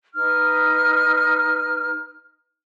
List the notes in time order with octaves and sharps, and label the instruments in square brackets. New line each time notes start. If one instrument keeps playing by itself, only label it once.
[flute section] D#4 B4 F6